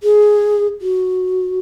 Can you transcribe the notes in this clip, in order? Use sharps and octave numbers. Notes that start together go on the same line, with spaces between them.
G#4
F#4